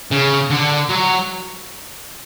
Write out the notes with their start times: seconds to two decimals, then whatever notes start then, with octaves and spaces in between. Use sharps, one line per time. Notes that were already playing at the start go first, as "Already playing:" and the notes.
0.11 C#3
0.50 D3
0.89 F#3